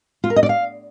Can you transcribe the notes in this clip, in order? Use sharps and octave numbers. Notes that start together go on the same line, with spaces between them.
F4
A#4
D#5
D5
F5